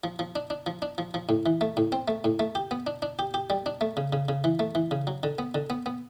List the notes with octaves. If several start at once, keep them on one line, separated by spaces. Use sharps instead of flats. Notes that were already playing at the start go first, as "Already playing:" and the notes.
F3
F3
D4
D4
F3
D4
F3
F3
A2
E3
A3
A2
C4
A3
A2
A3
G4
B3
D4
D4
G4
G4
G3
D4
A3
C#3
C#3
C#3
E3
A3
E3
C#3
F#3
D3
B3
D3
B3
B3